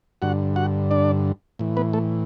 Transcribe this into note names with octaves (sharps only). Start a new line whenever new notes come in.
G2 D3 F#4 F#5
F#4 F#5
D4 D5
A2 E3
B3 B4
A3 A4